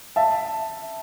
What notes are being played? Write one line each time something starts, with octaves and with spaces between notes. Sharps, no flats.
E5 A5